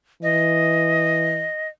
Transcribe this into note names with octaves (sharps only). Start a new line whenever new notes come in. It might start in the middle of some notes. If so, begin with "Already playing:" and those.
E3 D#5